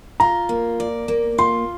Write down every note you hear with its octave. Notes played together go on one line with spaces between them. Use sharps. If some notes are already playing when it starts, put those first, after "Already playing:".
F4 A#5
A#3
D5
A#3
F4 C6